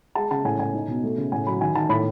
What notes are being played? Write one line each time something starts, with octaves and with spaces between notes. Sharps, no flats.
G#3 A5
C#3 A5
A2 G#5
A2 G#5
D#4
B2
A3
C#3
A2 G#5
F#3 B5
D#3 G#5
D#3 A5
A2 B5